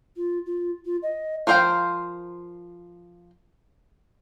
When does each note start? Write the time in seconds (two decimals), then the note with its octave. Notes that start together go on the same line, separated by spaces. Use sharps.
0.16 F4
0.46 F4
0.85 F4
1.02 D#5
1.47 F3 A#4 C5 F5 G5